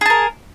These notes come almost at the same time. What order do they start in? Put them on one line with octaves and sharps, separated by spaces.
G#4 A5 A#4